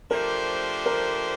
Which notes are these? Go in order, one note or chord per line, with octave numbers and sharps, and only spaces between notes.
F3 A3 D4 G4 A#4 C5
A#4